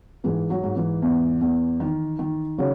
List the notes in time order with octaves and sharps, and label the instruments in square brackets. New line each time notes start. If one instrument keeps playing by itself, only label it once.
[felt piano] G#2 E3 G#3
F#3
G#2
E3
E2
E2
D#3
D#3
C#3 F#3